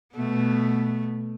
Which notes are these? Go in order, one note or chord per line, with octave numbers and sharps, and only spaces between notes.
B2 A3 B3